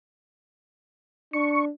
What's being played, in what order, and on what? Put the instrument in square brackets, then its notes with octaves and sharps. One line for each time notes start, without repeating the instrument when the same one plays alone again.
[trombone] D4 [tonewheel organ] C#6